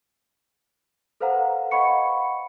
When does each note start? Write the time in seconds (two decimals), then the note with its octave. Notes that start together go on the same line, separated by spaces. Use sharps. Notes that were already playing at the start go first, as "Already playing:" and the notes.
1.20 A4 B4 C5 F5 F#5 A#5
1.71 D#5 F5 F#5 B5 C#6 C#7